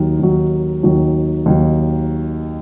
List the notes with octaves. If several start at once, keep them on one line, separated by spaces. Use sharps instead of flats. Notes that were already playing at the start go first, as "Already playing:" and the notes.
Already playing: D#2 D#3 F#3
D#2 D#3 F#3
D#2 D#3 F#3
D#2 D#3 F#3